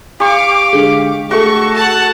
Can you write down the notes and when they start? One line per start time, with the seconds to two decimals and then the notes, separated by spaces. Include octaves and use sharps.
0.20 G4 F5 C#6 D6
0.73 D3 G#3
1.31 A3 F#4 G#4 A4 C#6
1.74 F#5 A5